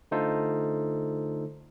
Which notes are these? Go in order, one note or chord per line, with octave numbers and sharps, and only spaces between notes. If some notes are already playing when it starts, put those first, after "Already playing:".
D3 A3 D#4 F4 A4 C5